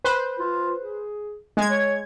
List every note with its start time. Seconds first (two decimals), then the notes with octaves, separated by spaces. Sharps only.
0.05 B4 C5
0.39 F4
0.80 G#4
1.57 G#3 G#6
1.70 C#5